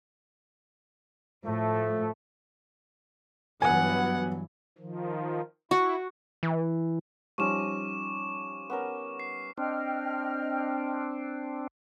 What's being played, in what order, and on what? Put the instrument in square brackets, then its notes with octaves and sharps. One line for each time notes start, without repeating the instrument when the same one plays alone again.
[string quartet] A2 [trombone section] F3 A3
[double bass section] G2 E3 F#3 [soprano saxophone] B3 [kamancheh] F#5 [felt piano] G#5
[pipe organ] D#3 F3
[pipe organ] E4 [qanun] F#4
[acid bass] E3
[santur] F3 C#4 [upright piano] G3 D#4 [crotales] C#6 D6 E7
[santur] B3 C#4 A#4
[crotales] C7
[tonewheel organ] C4 D4 [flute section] D#5 G5 F6